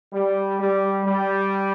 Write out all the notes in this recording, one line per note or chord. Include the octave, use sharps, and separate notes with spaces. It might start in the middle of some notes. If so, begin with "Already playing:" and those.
G3
G3
G3